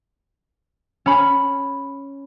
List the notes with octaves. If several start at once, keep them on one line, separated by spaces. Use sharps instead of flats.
C#4 B5